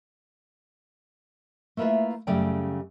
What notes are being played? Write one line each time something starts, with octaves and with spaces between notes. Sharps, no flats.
A3 A#3 E4 F4 B4 E5
F#2 C#3 G3 A3 D5 G5